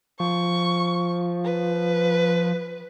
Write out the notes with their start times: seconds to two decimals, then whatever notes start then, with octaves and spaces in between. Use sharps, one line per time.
0.20 F3 C#6
1.44 B4